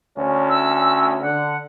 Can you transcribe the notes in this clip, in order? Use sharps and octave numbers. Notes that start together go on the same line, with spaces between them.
D2 C#4
E6
D3 F#5